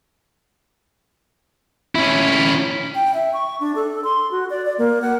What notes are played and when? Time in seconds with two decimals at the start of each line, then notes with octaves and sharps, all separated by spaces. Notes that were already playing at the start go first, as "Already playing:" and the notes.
1.95 C#4 E4
2.95 G5
3.14 E5
3.33 C#6
3.60 D4
3.75 A4
4.04 C6
4.31 F#4
4.50 D5
4.65 D5
4.78 A#3
5.02 F#5